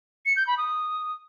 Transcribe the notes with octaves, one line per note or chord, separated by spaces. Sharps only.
C#7
G6
B5
D#6